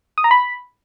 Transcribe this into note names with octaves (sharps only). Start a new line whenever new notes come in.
D#6
A#5
B5